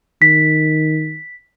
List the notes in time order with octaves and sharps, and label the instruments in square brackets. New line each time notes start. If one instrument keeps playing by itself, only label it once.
[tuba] D#3 [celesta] B6